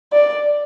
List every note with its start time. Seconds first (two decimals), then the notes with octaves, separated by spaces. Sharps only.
0.13 D5